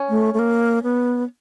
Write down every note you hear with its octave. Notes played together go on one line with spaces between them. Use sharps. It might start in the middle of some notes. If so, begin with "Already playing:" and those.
Already playing: C#4
A3
A3
A#3
B3